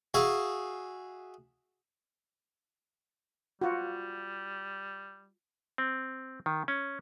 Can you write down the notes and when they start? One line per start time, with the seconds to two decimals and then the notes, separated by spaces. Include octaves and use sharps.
0.14 F#4 G#4 E5 F5
3.61 G3 F4 F#4
5.78 C4
6.46 D#3
6.68 C#4